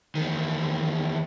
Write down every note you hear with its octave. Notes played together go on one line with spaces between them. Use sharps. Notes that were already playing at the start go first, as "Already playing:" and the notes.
E2 D#3